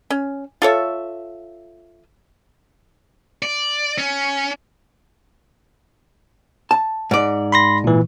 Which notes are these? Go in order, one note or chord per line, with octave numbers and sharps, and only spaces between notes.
C#4
F4 A4 C#5 E5
D5
C#4
A5
G#2 D5
B5 C6 A#6
A#2 E3